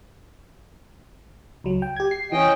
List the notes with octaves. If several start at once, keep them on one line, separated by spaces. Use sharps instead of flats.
C#2 F#3
G5
G4 G#6
C7
E3 C#4 D#5 G5